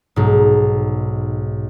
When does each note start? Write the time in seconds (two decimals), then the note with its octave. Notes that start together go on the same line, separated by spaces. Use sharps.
0.16 B1 G#2